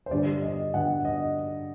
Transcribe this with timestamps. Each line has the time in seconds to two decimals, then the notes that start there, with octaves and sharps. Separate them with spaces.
0.06 C5
0.11 G2 D3 G3 D5
0.42 D#5
0.74 G2 D3 G3 F#5
1.05 D#5